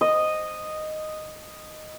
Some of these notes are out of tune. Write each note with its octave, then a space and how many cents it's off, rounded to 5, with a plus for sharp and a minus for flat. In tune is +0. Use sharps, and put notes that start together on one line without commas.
D#5 -5